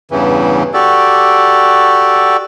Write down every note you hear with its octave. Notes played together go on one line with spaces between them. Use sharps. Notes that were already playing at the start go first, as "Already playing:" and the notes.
E2 G2 C#3 E3
F#4 G4 A4 D5